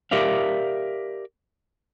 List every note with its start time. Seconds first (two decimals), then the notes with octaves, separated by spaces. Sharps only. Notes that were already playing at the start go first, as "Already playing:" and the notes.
0.11 G4 A#4 D5 E5 F5